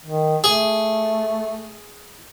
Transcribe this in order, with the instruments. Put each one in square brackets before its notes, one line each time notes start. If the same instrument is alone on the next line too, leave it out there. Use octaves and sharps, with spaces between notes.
[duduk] D#3
[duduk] A3 [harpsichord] G#4